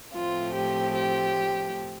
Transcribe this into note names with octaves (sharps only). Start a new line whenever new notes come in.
A2 F3 A3 C4 F4
G4
G4